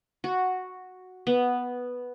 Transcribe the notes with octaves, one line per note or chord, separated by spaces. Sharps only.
F#4
B3